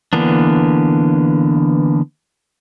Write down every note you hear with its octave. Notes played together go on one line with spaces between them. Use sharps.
D3 E3 A#3 B3 D4